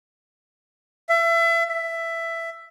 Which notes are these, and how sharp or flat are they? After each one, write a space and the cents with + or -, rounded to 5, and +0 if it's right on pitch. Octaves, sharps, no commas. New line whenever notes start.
E5 +30
E5 +10